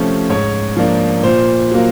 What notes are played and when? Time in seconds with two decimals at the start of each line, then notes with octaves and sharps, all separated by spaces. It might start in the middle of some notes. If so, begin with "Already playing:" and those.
Already playing: C3 F3 A3 C#4 C5
0.29 G#2 C#5
0.76 F3 A#3 D4
1.23 A#2 C5
1.71 F#3 A#3